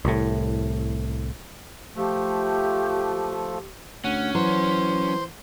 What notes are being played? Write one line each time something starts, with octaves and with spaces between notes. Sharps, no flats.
C2 A2
F3 A3 G4
D2 C#4 F#5
E3 F#3 C5 C6